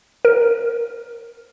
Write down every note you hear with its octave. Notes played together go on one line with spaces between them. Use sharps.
A#4